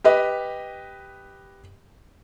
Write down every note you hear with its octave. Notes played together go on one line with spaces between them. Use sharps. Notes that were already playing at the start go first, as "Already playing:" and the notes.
G4 B4 D#5